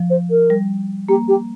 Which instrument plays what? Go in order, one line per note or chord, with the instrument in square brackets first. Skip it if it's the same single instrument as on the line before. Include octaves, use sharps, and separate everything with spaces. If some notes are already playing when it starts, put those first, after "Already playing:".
Already playing: [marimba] F3
[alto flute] C5
A#4
[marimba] G3
[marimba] A#3 [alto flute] G4
[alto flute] G4